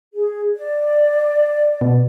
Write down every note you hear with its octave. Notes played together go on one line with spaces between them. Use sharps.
G#4
D5
B2